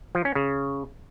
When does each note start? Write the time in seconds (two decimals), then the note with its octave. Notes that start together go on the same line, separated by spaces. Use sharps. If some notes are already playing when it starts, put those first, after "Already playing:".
0.15 F3
0.25 C#4
0.35 C#3